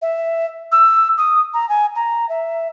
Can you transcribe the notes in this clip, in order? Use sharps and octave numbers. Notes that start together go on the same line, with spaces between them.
E5
E6
D#6
A#5
G#5
A#5
E5